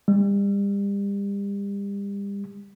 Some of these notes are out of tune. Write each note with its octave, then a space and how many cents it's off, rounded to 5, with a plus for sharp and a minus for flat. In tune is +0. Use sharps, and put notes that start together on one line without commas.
G3 +35